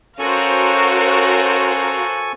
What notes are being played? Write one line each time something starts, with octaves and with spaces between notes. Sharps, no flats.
C#4 F#4 A4 A#4 C5 F5 G#5 C#6